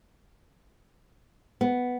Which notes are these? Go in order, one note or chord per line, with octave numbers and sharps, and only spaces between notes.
B3